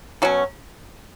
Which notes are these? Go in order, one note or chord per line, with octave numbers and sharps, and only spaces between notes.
B2 F#3 C#4